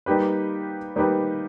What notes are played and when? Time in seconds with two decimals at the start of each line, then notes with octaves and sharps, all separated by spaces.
0.06 G3 A#3 D#4 G4 B4
0.96 G3 A#3 D#4 G4 B4